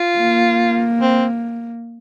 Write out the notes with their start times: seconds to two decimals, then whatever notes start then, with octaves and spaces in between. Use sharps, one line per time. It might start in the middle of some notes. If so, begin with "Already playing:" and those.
Already playing: F4
0.18 A#3
1.01 C4